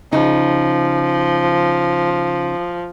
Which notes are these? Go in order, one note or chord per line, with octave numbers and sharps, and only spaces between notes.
C#3 F3 D#4